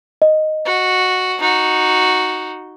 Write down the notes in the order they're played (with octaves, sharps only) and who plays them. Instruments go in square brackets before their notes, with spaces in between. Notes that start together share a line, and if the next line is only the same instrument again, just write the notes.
[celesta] D#5
[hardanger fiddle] F#4
D#4 F#4